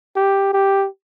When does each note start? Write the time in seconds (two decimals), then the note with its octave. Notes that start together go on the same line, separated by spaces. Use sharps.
0.16 G4
0.53 G4